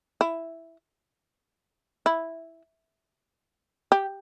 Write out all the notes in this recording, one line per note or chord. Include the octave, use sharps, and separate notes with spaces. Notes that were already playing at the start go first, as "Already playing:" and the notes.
E4
E4
G4